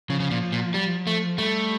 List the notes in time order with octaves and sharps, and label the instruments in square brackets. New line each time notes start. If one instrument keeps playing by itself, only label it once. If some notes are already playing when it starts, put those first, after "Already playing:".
[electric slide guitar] C#3 [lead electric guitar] F3
[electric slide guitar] C#3
A#2
A#2
G3
A3
[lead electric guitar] G3 [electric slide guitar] A3